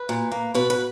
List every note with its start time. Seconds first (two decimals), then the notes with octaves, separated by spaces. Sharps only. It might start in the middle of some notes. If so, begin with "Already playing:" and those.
Already playing: B4
0.09 A#2
0.32 A#3
0.54 B2 B4
0.70 B4